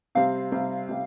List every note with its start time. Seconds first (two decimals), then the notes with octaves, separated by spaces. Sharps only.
0.15 C3 G3 C4 F5
0.52 C3 G3 C4
0.89 C3 G3